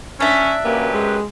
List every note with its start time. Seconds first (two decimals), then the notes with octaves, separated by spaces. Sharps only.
0.20 C#4 D4 E5
0.65 F#2 A#3 G4 B4
0.93 G#3